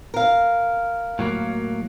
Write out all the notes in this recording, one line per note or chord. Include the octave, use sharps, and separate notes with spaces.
A#4 F5
A2 F#3 A#3